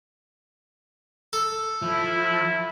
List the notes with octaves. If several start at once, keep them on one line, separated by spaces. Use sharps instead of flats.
A4
F3 E4